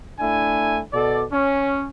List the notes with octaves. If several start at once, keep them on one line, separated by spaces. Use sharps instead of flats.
A3 D4 E4 G#5
B2 A4 D5
C#4